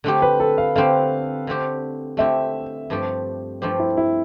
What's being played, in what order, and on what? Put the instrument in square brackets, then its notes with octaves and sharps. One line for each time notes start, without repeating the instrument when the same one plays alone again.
[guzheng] D3 A3 C4 G4
[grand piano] B4
A4
F5
[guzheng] D3 A3 C4 G4 [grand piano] F5
[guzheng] D3 A3 C4 G4
[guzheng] D3 A3 C4 G4 [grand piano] E5
[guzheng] G2 F3 A3 C4 G4
[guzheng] G2 F3 A3 C4 G4 [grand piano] C5
[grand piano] E4
E4